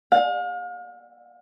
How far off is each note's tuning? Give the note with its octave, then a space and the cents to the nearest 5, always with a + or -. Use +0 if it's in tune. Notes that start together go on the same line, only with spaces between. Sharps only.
F5 +40